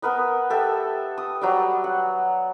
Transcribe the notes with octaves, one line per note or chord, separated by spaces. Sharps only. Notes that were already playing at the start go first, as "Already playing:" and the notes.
B3 A#4 B4 D#5
G4 A4 E5 G5
D#6
F#3 G3 D5
F#5